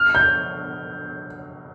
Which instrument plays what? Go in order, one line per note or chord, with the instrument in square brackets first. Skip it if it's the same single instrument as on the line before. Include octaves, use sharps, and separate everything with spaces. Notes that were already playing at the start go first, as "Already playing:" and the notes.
Already playing: [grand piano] F6
G6